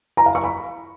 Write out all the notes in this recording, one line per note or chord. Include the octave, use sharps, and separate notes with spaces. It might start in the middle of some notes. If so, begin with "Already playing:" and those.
A#5
F5
C#6
B5